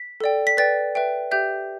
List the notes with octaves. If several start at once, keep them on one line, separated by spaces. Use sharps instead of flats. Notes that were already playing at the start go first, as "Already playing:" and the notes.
Already playing: B6
A4 D5 G5
B6
B4 D5 G5 A6
B4 E5 G5
G4 E5 G5 G6